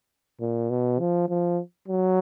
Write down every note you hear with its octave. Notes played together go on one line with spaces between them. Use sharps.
A#2
B2
F3
F3
F#3